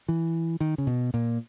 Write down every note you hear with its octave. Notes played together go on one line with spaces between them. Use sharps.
E3
D#3
C#3
B2
A#2